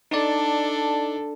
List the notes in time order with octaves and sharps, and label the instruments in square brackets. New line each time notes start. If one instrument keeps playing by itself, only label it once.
[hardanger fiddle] D4 A4 [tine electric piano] D#4 D5